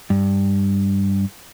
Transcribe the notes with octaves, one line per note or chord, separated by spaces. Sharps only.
G2